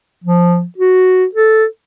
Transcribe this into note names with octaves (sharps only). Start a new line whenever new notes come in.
F3
F#4
A4